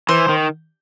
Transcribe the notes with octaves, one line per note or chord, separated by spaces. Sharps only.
E3 C5
D#3